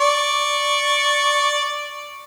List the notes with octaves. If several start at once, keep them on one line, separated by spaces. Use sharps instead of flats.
D5 C#6